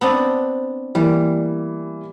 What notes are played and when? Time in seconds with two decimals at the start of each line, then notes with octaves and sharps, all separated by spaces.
0.01 B3 C4 D4
0.95 E3 G3 A#3